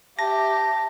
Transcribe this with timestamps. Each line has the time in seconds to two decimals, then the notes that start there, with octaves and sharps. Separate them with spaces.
0.19 G4 E5 A5 A#6